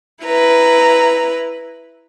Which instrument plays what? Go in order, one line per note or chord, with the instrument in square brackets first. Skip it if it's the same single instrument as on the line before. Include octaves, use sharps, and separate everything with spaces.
[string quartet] E4 B4 A#5